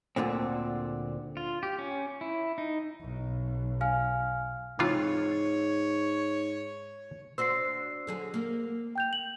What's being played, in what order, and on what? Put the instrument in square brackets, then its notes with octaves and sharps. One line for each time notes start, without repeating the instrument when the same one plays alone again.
[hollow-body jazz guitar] D2 A#2 D3 C4
[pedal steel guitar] F4
G4
C#4
E4
D#4
[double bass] B1
[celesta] F5 G#5 F6
[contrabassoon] G#2 [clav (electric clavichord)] C3 E3 F4 [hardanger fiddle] C#5
[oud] D4 F#4 C5 [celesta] E6 C7
[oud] D3 F#3 G#4
A#3
[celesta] G5 G6 F7
F#7